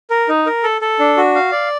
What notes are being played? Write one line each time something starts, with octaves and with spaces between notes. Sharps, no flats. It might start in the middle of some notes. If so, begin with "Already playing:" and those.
A#4
D#4
A#4
A4
A4
D4
F#4
F5
D5